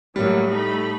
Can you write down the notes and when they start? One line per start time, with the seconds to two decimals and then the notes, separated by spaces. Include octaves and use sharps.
0.16 A2 F#3 G3 A#3 F#4
0.51 A3 D#4 B5